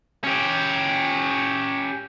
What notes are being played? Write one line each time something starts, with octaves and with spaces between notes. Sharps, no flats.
C#4 G4